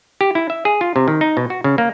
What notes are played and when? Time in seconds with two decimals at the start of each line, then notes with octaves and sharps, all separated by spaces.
0.21 G4
0.35 E4
0.50 E5
0.65 G#4
0.81 F4
0.96 C3
1.08 D#3
1.21 D#4
1.37 B2
1.50 F#4
1.64 C#3
1.78 A#3